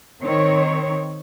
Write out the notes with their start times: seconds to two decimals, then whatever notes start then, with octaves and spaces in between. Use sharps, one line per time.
0.23 D#3 C4 C#5